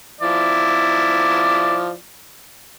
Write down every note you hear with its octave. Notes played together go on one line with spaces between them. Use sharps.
F3 E4 D5